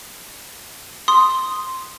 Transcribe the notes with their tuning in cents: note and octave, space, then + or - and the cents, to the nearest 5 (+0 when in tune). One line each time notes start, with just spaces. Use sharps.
C6 +0 D#6 +0